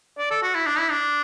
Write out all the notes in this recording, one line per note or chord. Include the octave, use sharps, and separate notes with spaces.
D5
A4
F#4
E4
D4
E4
D4